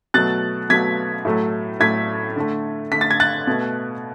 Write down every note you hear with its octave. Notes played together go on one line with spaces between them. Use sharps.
B2 F#3 A3 F#6 A6
B2 F#3 A3 G#6 B6
A2 F#3 A3
A2 F#3 A3 G#6 B6
D3 A3
D3 A3 B6
A6
G#6
F#6 A6
B2 A3